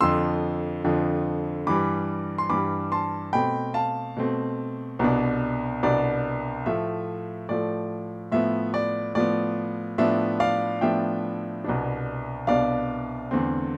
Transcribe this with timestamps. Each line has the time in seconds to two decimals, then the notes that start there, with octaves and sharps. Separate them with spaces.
0.01 F2 D3 F3 C6 E6
0.84 F2 D3 F3
1.66 G2 E3 G3 B5 D6
2.38 C6
2.49 G2 E3 G3 B5 D6
2.92 A5 C6
3.33 B2 A3 C4 G5 B5
3.74 F5 A5
4.17 B2 A3 C4
4.99 C2 B2 B3 D4
5.83 C2 B2 B3 D4 D5
6.66 A2 F3 A3 E5
7.49 A2 F3 A3 D5
8.32 A2 F3 B3 E5
8.74 D5
9.15 A2 F3 B3 D5
9.98 A2 F3 B3 D4 E5
10.40 D5 F5
10.81 A2 F3 B3 D4 E5 G5
11.64 C2 B2 B3 D4
12.47 C2 B2 B3 D4 D5 F5
13.31 E2 D3 A3 C4